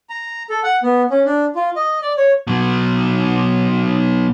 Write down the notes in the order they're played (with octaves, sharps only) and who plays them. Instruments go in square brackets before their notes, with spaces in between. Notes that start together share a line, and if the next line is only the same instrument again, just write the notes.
[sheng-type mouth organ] A#5
A4
F#5
B3
C#4
D4
F4
D#5
D5
C#5
[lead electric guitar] B2 F#3